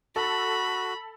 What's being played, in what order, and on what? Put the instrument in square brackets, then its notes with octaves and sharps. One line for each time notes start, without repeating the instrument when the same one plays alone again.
[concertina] F#4 [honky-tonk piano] A4 [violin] B5